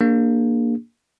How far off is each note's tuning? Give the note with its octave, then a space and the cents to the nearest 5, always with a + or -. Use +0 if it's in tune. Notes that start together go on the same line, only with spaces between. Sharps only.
A#3 +0 D4 +5 G#4 -35